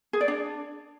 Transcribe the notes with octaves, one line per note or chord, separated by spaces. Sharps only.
G#4
D5
D4